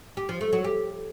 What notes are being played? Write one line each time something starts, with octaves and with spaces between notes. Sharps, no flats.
G4
F3
A3
F#3
G4